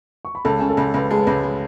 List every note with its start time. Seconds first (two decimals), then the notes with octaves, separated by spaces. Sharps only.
0.25 C#6
0.35 B5
0.45 C#2 A4 A5
0.59 C#3 G#5
0.69 A4 A5
0.77 C#2
0.94 C#2 B4 B5
1.10 G#3 A5
1.19 B4 B5
1.27 C#2
1.43 G#3